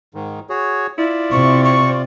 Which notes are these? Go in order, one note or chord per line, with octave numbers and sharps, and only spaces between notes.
G#2 D#3
F#4 G#4 C#5
E4 F4 D5
C3 C4 C#6
C#6